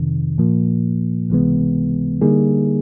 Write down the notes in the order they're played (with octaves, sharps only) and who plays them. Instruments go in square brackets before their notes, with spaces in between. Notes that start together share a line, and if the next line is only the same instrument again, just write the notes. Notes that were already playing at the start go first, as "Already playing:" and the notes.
Already playing: [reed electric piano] F2 C3 D#3
A#2 F3 A#3
C#2 C3 E3 G#3 B3
D3 G3 A#3 D#4 G#4